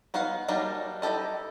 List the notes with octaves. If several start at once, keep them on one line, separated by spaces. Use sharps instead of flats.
B3 D#4 B4 F5 F#5
F#3 G3 A#3 D4 D#4
D#4 E4 G4 A4 D#5